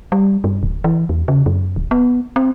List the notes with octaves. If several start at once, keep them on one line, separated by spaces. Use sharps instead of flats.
G3
G2
D1
E3
E2
C#3
F#2
D1
B3
C4